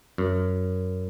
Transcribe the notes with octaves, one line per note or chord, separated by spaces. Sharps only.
F#2